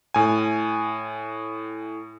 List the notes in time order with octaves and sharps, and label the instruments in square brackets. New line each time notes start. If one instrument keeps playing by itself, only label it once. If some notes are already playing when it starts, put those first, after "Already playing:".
[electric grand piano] A2 G#5